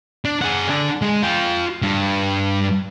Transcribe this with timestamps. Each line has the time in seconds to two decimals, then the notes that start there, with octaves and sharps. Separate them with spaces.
0.25 D4
0.42 G#4 F#5
0.67 D3 D4
1.02 G#3
1.22 F4 G5
1.82 G2